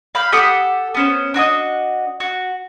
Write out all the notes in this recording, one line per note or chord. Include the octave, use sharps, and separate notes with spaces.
F5 B5 F6 G6
G4 A4 F#5 D#6
B3 C#4 C5
D4 F#4 C#5 D#5
F#4